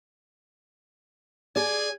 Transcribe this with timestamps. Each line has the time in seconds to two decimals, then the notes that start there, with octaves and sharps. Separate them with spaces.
1.56 G#4 D5 G#5